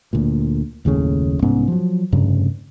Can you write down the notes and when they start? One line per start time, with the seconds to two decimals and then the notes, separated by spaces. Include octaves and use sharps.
0.13 D2 A#2
0.85 F#1 D#2 A2 C#3
1.42 C2 G#2 B3 C#4
1.68 F3 F#3
2.12 F1 G2 C#3